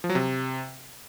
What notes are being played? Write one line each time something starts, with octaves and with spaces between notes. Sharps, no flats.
F3
F#3
C3